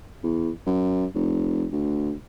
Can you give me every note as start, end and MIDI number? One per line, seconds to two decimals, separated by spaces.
0.24 0.50 40
0.67 1.06 42
1.15 1.66 29
1.72 2.14 38